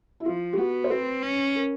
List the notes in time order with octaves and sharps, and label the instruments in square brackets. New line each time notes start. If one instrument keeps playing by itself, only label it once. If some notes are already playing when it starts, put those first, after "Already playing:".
[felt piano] E4
[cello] F3 [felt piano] F4
[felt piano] G4
[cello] B3 [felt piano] F#4
[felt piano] C5
[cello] C4 [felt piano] B4
[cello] C#4
[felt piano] A#4